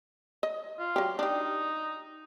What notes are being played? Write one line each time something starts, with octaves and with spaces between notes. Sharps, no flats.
D#5
F4
F#3 G4
D4 D#4 G4